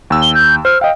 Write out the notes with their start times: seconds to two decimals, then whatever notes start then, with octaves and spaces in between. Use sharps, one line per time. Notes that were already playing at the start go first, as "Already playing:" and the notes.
0.10 D#2 E6
0.22 G7
0.35 G6
0.65 C5 F6
0.81 D#5 F5 G5